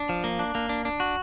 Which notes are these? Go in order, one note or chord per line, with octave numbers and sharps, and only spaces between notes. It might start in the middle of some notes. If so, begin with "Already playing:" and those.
Already playing: D4
F3
A#3
D4
A#3
D4
D4
F#4